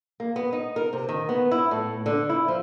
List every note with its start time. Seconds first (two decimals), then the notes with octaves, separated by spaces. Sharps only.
0.20 A#3
0.36 B3
0.53 D#4
0.76 A#4
0.93 C3
1.09 D#3
1.29 B3
1.51 E4
1.71 A2
2.06 D3
2.29 E4
2.48 F3